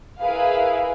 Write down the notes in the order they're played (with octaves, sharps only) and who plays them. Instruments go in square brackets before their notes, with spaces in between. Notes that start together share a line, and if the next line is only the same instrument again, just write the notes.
[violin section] E4 G#4 A#4 B4 F5